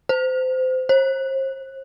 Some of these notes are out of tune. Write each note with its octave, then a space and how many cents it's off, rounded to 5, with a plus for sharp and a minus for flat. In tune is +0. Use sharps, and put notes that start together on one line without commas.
C5 -25
C5 +40